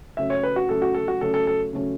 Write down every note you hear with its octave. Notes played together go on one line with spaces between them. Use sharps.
C#3 F#3 A3 C#4 E5
C#5
B4
F#4
C#3 F#3 A3 C#4 A4
F#4
A4
F#4
C#3 F#3 A3 C#4 A4
A4
A4
C#3 F#3 A3 C#4